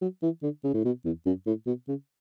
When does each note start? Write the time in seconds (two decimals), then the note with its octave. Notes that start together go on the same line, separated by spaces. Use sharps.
0.01 F#3
0.23 E3
0.43 D3
0.64 C#3
0.74 A2
0.85 B2
1.05 E2
1.26 F#2
1.46 A2
1.66 B2
1.88 C#3